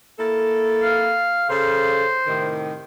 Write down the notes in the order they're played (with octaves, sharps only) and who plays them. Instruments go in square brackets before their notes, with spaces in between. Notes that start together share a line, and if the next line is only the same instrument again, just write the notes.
[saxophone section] A#3 E4 A4
[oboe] F5
[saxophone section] C#3 A4 [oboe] C5
[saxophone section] A2 C3 D#3